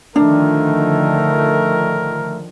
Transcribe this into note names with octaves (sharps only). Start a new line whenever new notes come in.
D3 D#3 F3 A3 D4 A#4